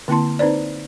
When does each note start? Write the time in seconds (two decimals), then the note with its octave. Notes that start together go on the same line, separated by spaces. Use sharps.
0.08 D3 A#3 C4 E4 A5 C6
0.39 C4 D#4 B4 C5 D5